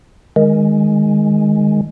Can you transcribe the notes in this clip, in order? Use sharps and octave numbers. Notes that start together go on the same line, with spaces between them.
D#3 G#3